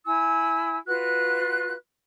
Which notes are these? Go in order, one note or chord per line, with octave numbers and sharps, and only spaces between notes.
E4 G#5 E6
F4 F#4 B4 F#6